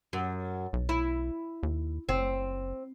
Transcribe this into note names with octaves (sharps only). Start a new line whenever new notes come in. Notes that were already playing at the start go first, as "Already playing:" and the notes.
F#2
B1
E4
D#2
F#1 C4